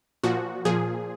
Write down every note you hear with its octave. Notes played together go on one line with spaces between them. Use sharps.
A#2 F3 F#4
A#2 F3 G#4